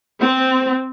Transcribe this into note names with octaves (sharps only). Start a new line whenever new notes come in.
C4